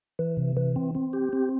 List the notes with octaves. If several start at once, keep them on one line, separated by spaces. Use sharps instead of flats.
E3
C3
E3
C4
C4
G4
C4